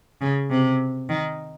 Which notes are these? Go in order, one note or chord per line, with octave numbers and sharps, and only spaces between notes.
C#3
C3
D#3